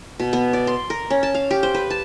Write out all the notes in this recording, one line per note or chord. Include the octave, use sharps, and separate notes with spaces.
B2
B3
D5
C6
A#4
C#4
A5
F5
G4
C5
B4
A5